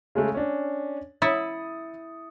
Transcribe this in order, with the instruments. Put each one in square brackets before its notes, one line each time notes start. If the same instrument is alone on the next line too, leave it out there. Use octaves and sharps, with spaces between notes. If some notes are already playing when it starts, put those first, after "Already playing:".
[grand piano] C#3 G#3 A3
C#4 D4
[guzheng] E4 [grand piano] D#6 A6 C#7